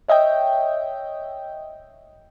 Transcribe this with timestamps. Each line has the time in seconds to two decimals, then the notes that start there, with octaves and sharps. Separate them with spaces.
0.08 C#5 D#5 E5 G5